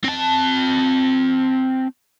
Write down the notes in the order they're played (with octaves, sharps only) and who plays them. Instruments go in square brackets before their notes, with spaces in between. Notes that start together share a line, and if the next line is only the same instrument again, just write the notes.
[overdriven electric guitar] C4 A5